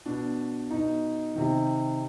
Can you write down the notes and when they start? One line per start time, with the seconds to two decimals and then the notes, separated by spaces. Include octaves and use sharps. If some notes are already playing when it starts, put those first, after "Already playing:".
0.06 B2 D4
0.71 B2 D#4
1.36 C3 D#3